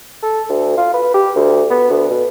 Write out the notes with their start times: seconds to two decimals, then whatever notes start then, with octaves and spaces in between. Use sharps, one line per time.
0.23 A4
0.49 D2
0.77 F4
0.94 B4
1.14 G4
1.35 D2
1.70 B3
1.90 D2
2.10 B2